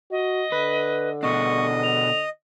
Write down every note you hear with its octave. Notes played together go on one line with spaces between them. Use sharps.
F#4 D#5
D3 B4
B2 D4 D#5 C#6
F7